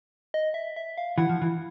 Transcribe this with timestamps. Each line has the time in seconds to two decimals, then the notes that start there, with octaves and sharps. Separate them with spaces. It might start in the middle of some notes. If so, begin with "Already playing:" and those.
0.34 D#5
0.54 E5
0.76 E5
0.98 F5
1.18 E3 F#5
1.29 F3
1.42 E3